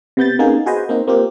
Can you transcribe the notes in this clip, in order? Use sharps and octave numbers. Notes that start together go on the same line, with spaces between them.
C3 B3 G6 A6
A#3 B3 C#4 D#4 G#4
F#4 G#4 B4 C5 D#5
A#3 C4 D#4
A#3 C4 F4 G4